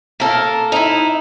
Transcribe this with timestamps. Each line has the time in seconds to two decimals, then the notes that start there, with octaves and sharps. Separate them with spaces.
0.20 A#3 A4 A#4
0.72 D#4 E4